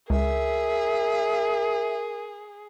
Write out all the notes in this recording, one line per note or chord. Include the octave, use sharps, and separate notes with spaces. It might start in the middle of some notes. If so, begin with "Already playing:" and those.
C#2 G#4 A#4 E5